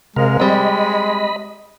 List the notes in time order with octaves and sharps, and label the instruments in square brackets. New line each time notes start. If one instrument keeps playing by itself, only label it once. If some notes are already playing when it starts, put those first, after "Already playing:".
[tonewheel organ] C3 A#4 F5 [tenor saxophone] G#3
[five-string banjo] G3 C4 [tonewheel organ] D#5 B5